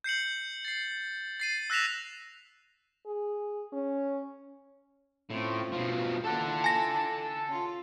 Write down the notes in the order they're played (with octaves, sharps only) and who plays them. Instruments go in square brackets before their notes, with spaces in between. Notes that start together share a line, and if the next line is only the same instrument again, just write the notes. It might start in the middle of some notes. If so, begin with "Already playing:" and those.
[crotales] G6 C7 C#7 F#7
A6 C7
A6 C7 D#7
E6 F#6 A#6 B6 E7 F7
[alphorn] G#4
C#4
[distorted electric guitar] A2 [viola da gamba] C4 C#4 F4
[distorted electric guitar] B2 F3
[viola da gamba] A#3 E4 F4 [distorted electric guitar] A4 F#5 [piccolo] A5
[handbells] G#5 A#6
[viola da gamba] C#4 F4